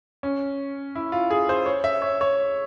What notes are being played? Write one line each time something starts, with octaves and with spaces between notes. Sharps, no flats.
C#4
E4
F4
G#4
C5
C#5
E5
C#5
C#5